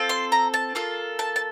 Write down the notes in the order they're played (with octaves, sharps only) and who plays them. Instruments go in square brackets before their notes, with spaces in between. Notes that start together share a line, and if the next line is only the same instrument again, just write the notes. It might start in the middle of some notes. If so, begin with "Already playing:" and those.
Already playing: [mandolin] C4 F4 A4
C6
A#5
A5
A#3 F4 A4
A5
A5